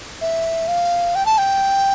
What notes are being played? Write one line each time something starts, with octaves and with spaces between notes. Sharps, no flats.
E5
F5
G5
A5
G5